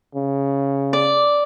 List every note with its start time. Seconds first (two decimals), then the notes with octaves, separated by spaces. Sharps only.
0.15 C#3
0.93 D5